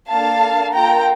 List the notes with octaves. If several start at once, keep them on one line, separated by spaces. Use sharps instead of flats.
A#3 D4 A4 F5 A5
A#3 F4 A4 G5 A#5